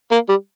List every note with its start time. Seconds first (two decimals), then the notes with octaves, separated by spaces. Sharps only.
0.12 A#3
0.29 G3